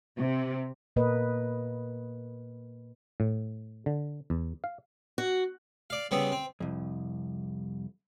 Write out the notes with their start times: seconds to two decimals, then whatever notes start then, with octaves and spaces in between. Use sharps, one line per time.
0.18 C3
0.96 A#2 A#3 A#4 B4 D#5
3.20 A2
3.86 D3
4.30 E2
4.64 F5
5.18 F#4
5.90 D5 F5
6.11 C#3 G3 B3 C4
6.32 C4
6.60 C2 F2